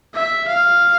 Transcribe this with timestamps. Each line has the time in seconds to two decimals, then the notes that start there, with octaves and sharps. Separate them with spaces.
0.14 E5
0.48 F5